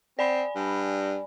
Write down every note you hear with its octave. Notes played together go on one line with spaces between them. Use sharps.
C4 D5 G#5 B5
G2